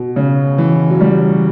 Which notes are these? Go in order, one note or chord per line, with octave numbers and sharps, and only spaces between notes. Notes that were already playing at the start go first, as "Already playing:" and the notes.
Already playing: B2
C#3
E3
F#3
G3